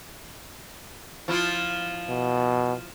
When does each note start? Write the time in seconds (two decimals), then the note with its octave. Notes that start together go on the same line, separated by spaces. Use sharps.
1.28 F3 E4 F4
2.09 B2